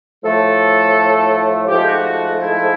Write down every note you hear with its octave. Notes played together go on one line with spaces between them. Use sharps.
A2 F3 A3 A4
G#2 F3 A3 G4
F#4
F#4
E4